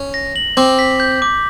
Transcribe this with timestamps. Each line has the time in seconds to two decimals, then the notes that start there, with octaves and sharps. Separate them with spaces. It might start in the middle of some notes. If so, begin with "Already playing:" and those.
Already playing: C#4
0.14 A#6
0.36 F#7
0.57 C4 D6
0.79 B6
1.00 G6
1.22 D6